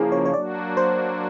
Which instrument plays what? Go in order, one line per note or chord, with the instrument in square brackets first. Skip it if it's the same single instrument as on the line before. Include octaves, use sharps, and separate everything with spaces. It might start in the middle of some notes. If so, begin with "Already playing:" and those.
Already playing: [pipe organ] C#3 F3 A#3 [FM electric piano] E4 G#4
[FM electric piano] C#5
C#5
[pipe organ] F#3 A#3 D4 F#4 [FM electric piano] D5
[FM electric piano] C5